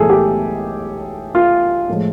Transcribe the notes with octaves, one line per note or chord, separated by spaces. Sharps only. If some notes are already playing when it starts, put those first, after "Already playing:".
Already playing: B1 A2 E3 G#3 G#4 A4
G4
F4
A2 F3 G#3